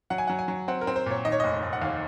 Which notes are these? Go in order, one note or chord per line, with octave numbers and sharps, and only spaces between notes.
F#3 F#5
G#5
F#3 F#5
G#5
F#3
C4 F#5
A#4
C4
C5
A#2 C#5
D#3 D#5
C#5
F1 D#5
F1
F#5
D#2 F5